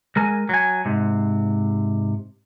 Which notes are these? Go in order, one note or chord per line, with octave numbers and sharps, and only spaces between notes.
G#3 A#4 G#5
F#3 G#5
G#2 C3